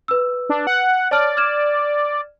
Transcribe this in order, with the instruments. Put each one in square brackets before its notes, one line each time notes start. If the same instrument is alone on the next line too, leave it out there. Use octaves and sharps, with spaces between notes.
[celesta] B4 E6
[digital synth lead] D4
F#5
[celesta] C#5 A5 F6 [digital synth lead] D5
[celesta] F6 G#6 E7